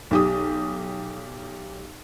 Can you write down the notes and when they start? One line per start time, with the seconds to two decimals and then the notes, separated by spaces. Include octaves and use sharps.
0.11 B1 G4 D#6